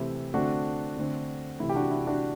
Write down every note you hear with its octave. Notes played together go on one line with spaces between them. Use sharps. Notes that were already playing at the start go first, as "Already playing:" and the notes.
Already playing: C3 E3 A3 C4 E4 G4
D3 A3 C4 D4 F#4
D3 A3 C4
C3 E3 A3 E4
G4
D4 F#4
E4
D4 F#4